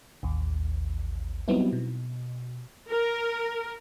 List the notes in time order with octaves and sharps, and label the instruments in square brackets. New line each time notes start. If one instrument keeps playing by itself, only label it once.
[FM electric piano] A1 D#2
F#3 G3 B3 C4 D#4 E4
B2
[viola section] A#4